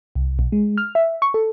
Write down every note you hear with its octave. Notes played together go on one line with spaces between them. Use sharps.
C2
B1
G#3
F6
E5
C#6
A4